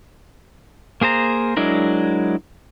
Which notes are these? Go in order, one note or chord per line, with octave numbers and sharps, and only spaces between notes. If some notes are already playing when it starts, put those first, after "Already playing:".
A#3 G#4 C5 A#5
F#3 G#3 D4 E4 A#4